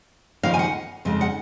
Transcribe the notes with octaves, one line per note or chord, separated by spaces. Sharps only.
D#2 C#3 F3 A#3 D#4 F5
G#5
F#5
F2 C#3 G#3 D#4
F#5